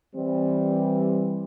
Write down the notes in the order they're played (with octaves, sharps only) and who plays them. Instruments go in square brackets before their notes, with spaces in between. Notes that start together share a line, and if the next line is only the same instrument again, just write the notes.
[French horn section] E3 G3 C4